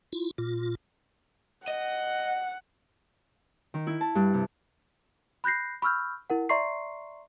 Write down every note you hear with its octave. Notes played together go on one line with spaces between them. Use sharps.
E4 F4
A#2 F4
D#5 F#5
D#3
E4
A5
G2
C3
B5 F#6 G6 A#6 C7
B5 C#6 E6 F6 G6
E4 A#4 F#5
D5 E5 A#5 C6 C#6 C7